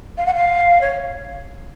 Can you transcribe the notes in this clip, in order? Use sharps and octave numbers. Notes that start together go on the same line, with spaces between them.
F5
F#5
F5
C#5